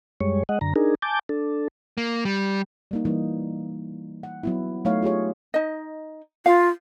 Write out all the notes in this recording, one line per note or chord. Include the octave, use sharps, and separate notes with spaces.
F#2 G3 G#3 C#5
G#3 D#5 F#5
F#2 D3 A#5
D4 D#4 G#4 A#4
G#5 A5 D6 G6
D4 A4
A#3
G3
G3 A#3 D#4
E3 G3 A#3 D#4
F#5
F#3 B3 E4
F#3 A3 D#4 C#5 F5
F4 G4 G#4 C#5
D#4 D#5
F4 F5